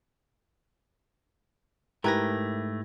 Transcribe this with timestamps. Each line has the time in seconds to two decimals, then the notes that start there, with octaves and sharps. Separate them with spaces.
2.04 G#2 A3 E4 G4 A#4 B4 G#6 A#6